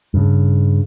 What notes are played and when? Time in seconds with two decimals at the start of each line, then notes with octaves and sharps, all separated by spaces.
0.14 G2 C#3